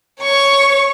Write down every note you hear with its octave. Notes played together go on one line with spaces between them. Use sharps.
C#5 C#6